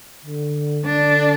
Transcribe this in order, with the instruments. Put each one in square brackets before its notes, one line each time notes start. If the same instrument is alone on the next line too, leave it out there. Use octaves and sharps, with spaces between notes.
[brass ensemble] D3
[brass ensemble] D3 [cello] D4